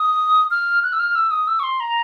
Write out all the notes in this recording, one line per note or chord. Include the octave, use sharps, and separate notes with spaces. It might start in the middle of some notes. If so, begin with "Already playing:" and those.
Already playing: D#6
F6
F#6
E6
F6
E6
D#6
E6
C#6
C6
A#5